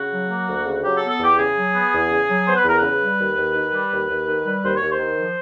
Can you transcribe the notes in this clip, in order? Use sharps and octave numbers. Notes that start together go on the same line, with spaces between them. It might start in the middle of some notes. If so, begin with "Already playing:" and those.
Already playing: C#3 F#4
F#3
A#3
D2
C#3
F#3 G4
B3 A4
A4
E2 G4
C#3 G#4
F#3
B3
E2
C#3
F#3
B3 C5
B4
E2 A#4
C#3 B4
G3
D#2
D#2
D#3
G3
D#2
D#2
D#3
G3
D#2 C5
D#2 C#5
C5
D#3
F3